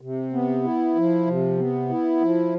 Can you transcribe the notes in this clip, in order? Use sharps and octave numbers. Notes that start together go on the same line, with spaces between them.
C3
B3
E4
F3
C3
B3
E4
F3